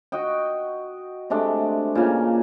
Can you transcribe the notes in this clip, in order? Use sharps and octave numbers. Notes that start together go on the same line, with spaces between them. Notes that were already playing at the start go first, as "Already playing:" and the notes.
F#4 D#5 G5
C3 G#3 A3 D4
A#2 C#3